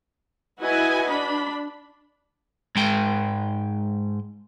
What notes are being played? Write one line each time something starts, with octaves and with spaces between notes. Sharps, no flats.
E4 F#4 B4 D#5 G#5
D4 B5
G#2 G#3 G5